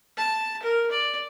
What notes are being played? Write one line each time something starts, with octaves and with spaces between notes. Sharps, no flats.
A5
A#4
D5